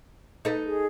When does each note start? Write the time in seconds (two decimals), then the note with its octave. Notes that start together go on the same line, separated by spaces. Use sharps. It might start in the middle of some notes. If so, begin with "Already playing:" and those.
0.45 D#4 A4 B4
0.66 G#4